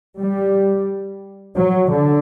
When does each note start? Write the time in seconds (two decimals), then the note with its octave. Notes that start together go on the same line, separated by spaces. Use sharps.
0.19 G3
1.56 F#3
1.90 D3